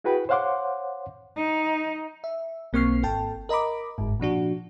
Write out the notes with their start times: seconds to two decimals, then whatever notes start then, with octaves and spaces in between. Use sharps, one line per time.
0.04 E4 F#4 G#4 B4 G5 B5
0.29 C5 C#5 F5 F#5 C6 D6
1.37 D#4
2.24 E5
2.73 B1 A#3 C4 C#6 F6 C7
3.03 G#1 A4 G5 A5
3.49 A#4 D#5 A#5 B5 D6
3.98 G1 G#2
4.20 A#2 F3 D4 F#4